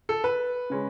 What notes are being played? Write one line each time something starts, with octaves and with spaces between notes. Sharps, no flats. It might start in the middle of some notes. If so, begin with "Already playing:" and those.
A4
B4
C#3 G#3 C#4